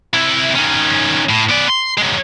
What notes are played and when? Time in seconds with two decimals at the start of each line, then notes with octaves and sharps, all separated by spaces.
0.13 C3 E4
0.55 D#3 C#4
1.30 A2
1.50 B3 D5
1.69 C6
1.98 F#3 G#3